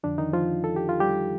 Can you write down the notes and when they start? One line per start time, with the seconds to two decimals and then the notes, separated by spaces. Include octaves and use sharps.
0.04 F2 D3 F3 D4
0.18 D#3 D#4
0.33 F3 F4
0.64 A4
0.76 G4
0.89 F4
1.00 G3 G4